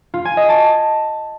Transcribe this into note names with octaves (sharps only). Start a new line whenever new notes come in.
F4
G#5
D#5
A5